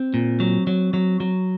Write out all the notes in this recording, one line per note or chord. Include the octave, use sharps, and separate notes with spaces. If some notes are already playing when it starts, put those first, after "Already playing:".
Already playing: C4
A#2
F#3
F#3
F#3
F#3